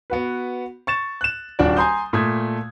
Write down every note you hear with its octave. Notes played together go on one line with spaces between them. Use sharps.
B3 F#4 B4
C#6 A6 E7
F#6 E7
D#1 D4 F4 F#4 D5
G#5 A#5 C6 D#6 G6
A#2 A3 D#6 G#6